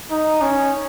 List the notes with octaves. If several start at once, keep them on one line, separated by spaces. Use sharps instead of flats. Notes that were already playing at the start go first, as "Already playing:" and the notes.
D#4
C#4